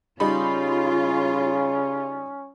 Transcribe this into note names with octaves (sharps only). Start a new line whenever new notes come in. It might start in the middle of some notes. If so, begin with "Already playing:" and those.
C#3 G3 C#4 D#4 F4 B5